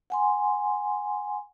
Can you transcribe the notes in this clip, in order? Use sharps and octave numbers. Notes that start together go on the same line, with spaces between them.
F#5 G#5 C6